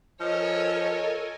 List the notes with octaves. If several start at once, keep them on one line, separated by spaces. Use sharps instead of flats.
F3 A4 A#4 C#5 D#5 G#5